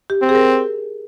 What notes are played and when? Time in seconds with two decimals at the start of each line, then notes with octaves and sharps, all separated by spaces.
0.10 G4
0.22 C4
0.29 G#4
0.35 A#4